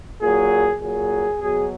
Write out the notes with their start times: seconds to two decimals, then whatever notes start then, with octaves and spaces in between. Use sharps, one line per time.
0.22 A#2 F#3 G#4
0.81 A#2 F#3 G#4
1.40 B2 F#3 G#4